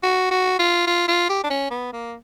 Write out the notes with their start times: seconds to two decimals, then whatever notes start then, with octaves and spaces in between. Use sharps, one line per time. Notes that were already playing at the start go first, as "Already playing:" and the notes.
0.03 F#4
0.31 F#4
0.60 F4
0.87 F4
1.08 F4
1.30 G4
1.44 D4
1.50 C#4
1.71 B3
1.93 A#3